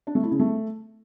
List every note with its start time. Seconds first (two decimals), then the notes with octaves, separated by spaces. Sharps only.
0.07 D4
0.15 A3
0.23 E4
0.31 C#3
0.40 A3